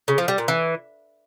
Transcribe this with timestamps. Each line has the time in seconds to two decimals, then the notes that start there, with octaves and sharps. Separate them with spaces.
0.08 C#3
0.18 F3
0.28 G3
0.38 A#2
0.48 E3